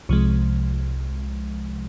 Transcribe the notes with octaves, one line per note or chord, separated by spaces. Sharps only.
C2 C3 F3 G#3